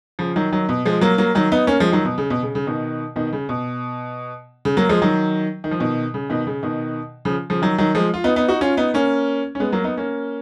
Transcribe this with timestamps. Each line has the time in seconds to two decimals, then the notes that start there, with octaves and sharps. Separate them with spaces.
0.19 C#3 F3
0.36 D#3 F#3
0.52 D#3 F#3
0.69 B2
0.86 F3 G#3
1.01 F#3 A#3
1.18 F#3 A#3
1.35 D#3 F#3
1.52 B3 D#4
1.67 A#3 C#4
1.80 F3 G#3
1.92 D#3 F#3
2.05 B2
2.18 C#3
2.30 B2
2.43 C#3
2.55 C#3
2.67 B2 D#3
3.16 B2 D#3
3.33 C#3
3.49 B2
4.65 C#3
4.77 F#3 A#3
4.89 F3 G#3
5.02 D#3 F#3
5.64 D#3
5.71 F3
5.80 B2 D#3
6.14 C#3
6.30 B2 D#3
6.47 C#3
6.63 B2 D#3
7.25 C#3 F3
7.50 C#3 F3
7.62 D#3 F#3
7.78 D#3 F#3
7.95 F3 G#3
8.14 F4
8.24 B3 D#4
8.36 B3 D#4
8.48 D#4 F#4
8.61 C#4 F4
8.77 B3 D#4
8.94 A#3 C#4
9.55 C#4
9.60 G#3 B3
9.72 F#3 A#3
9.84 B3 D#4
9.98 A#3 C#4